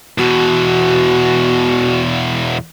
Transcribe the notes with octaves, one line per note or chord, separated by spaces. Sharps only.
E2 B2 F#4